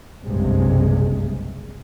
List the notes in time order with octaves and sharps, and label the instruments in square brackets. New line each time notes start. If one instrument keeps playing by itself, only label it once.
[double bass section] F#1 B1 G2 C3 G#3